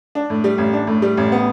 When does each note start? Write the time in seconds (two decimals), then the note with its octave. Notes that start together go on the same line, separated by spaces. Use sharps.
0.15 D4
0.30 A2
0.44 G3
0.58 A1
0.73 D4
0.87 A2
1.02 G3
1.17 A1
1.32 B3